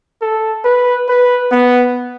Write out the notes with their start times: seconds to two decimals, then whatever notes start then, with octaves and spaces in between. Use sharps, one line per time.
0.21 A4
0.64 B4
1.09 B4
1.51 B3